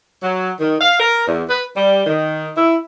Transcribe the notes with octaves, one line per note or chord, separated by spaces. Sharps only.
F#3
D#3
F5
A#4
E2
B4
G3
D#3
E4